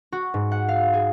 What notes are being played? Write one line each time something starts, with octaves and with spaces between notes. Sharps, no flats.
F#4
G#2
F#5
F5
G#4